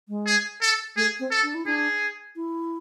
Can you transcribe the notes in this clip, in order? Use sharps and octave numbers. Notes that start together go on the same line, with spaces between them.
G#3
G#4
A4
A3 G#4
C4
A4
D4
E4
D4 G#4
E4